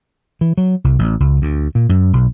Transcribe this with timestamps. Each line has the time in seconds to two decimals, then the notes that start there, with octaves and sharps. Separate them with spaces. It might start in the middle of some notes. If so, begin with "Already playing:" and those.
0.41 E3
0.58 F#3
0.84 C2
0.99 A1
1.20 C#2
1.42 D2
1.75 A#2
1.89 F#2
2.13 B1